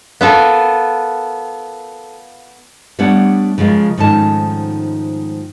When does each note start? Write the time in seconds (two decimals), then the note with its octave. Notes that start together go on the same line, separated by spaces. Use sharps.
0.21 B3 F4 A4 A#4
2.99 G3 A3 B3 D4 C#5 F#5
3.58 C#3 F3 G#3 F4 A#4
3.97 G#2 D#3 F3 A3 C#4 A5